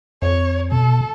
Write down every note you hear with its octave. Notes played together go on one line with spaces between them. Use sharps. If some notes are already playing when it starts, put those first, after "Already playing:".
F2 C#5
B2 A4